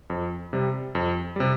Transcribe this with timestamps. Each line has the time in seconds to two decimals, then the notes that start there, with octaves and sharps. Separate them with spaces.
0.10 F2
0.53 C3 G3
0.95 F2
1.36 C3 G3